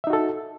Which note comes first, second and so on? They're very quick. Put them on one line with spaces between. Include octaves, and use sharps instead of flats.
E5 D#4 F#4 A4